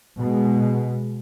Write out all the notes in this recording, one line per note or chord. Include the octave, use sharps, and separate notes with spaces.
B2 G#3